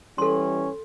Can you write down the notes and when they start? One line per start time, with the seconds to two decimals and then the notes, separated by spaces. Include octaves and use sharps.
0.18 E3 G3 C#4 A4 C6